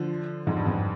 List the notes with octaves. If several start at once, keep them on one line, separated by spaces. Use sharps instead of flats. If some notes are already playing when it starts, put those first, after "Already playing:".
Already playing: D3 F3
F2 G#2
G2
F2 G#2